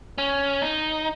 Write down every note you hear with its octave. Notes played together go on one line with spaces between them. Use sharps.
C#4
D#4